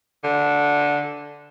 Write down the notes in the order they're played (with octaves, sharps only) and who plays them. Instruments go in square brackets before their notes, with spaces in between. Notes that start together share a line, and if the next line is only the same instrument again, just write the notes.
[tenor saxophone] D3